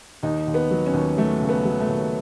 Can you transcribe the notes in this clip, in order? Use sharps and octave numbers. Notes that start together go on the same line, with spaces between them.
D#2 D#4
D#2
B3
F#3
C#4
D#2
F#3 A3
C#3
B3
F#3
A3
D#2